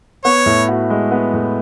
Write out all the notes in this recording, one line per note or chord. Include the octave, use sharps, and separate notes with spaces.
B3 C#5
A2
F#4
G#3
B3
A2